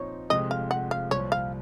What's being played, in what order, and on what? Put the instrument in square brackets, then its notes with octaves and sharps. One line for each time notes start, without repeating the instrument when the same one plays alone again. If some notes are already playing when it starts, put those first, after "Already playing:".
Already playing: [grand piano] A#2 F3 C4 D#4 [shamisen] C#5
[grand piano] F1 F2 C3 F3 G#3 [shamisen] D#5
[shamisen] F5
F#5
F5
[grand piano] C2 A#2 F3 [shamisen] C#5
[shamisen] F5